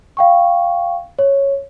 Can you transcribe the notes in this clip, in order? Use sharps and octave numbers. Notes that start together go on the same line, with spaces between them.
F5 G5 C#6
C#5